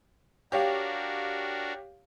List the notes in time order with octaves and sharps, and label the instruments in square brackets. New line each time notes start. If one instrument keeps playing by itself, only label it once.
[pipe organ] D4 F#4 A#4 [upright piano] G4 C#5 F5